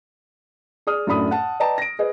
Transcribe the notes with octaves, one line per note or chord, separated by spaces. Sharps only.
G#4 D5 D#6 F6
F#2 A2 D4 B5 D#6
F#5 A5
B4 D5 D#5 G5 A5 A#5
A#6 D7
G#4 B4 C5 D#5